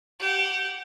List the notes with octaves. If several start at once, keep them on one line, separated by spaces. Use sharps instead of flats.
G4 F#5